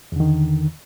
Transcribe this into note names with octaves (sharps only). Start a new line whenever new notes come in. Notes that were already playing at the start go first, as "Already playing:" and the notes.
E2 D3 D#3